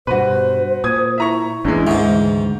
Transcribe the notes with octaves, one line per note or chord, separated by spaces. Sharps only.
G2 B2 F#4 B4 C5
A#2 D#6 G#6
E4 E5 A#5 C#6
G#1 E2 E3 G#3 C#4 D4
D2 G#2 D#3 E3